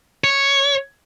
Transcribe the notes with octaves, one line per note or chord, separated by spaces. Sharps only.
C#5